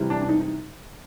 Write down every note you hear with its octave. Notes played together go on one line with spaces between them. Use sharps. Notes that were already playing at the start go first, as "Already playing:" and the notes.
Already playing: C3 E3 G3
D4
D4
D#4
D#4